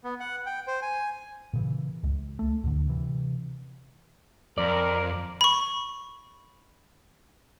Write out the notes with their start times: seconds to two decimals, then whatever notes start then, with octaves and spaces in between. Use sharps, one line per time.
0.04 B3
0.20 F#5
0.46 G5
0.67 C5
0.82 G#5
1.53 A#2 C#3 E3
2.04 C#2
2.39 A3
2.64 D2 A2 D3
2.89 C3 E3
4.58 F2 A#4 D5
5.41 B5 C#6